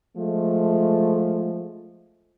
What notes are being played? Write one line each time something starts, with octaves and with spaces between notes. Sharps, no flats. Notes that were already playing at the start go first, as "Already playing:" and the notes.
F3 G#3 A3